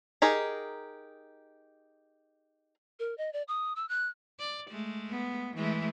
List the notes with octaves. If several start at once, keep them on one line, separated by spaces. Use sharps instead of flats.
D#4 G4 G#4 A#4
A#4
D#5
D5
D#6
E6
F#6
D5
G#3 A3
B3
E3 G#3 A3